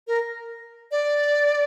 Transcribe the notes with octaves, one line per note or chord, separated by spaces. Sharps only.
A#4
D5